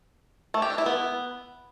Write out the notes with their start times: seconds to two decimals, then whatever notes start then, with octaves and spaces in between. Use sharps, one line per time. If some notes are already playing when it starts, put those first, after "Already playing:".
0.54 A3
0.62 G4
0.70 D4
0.78 E4
0.86 B3